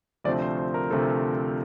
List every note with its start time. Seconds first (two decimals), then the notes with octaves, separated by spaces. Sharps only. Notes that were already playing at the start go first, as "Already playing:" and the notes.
0.24 D2 C3 F3 A3 C4 D5
0.42 C5
0.57 C5
0.74 A#4
0.90 D2 C3 F3 A3 C4 A4